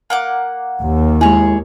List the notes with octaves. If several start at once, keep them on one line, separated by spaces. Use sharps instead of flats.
A#3 F#5 D6
D#2
G#3 E4 G#4 C#5